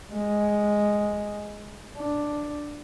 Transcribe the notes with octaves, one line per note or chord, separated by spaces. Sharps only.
G#3
D4